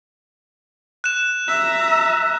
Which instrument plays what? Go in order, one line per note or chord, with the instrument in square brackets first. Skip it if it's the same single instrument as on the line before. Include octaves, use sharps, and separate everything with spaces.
[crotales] F#6 E7
[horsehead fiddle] E5 A#5